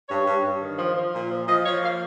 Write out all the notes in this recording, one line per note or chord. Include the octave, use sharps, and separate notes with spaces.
G2 C#5
G2
G2
D#3
F3
F3
A#2
F3
F3 D#5
F3 C#5
A#3 F5